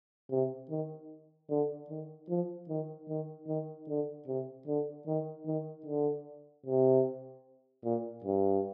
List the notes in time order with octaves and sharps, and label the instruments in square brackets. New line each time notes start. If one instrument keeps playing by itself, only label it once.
[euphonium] C3
D#3
D3
D#3
F3
D#3
D#3
D#3
D3
C3
D3
D#3
D#3
D3
C3
A#2
G2